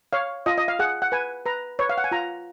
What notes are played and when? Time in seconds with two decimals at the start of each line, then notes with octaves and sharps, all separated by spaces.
0.13 C#5 F5
0.46 F4 D#5
0.58 D#5
0.68 F5
0.79 G#4 F#5
1.02 F#5
1.12 B4 G#5
1.45 B4 A#5
1.79 B4 C#5
1.90 F5
1.98 F#5
2.04 G#5
2.11 F4 A#5